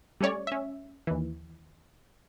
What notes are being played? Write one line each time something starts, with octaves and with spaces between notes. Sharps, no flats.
G3 A3 C#4 C#5 D5
C#4 E5
D#2 E3